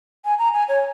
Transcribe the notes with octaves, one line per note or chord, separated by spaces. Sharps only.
G#5
A#5
G#5
C#5